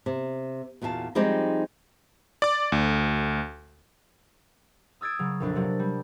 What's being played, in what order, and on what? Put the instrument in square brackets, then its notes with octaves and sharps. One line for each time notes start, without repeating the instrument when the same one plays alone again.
[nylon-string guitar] C3
E2 A#2 F#4 F5 A5
F3 G3 G#3 C4 D#4 G4
[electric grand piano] D5 D6
D2
[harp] D#6 E6 G#6 A6 D7
C#3 F#3
A#1 F2 D4
C3 F#3 D5
G3